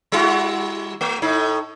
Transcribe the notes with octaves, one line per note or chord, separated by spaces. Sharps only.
G3 E4 F#4
A3
A2 D#4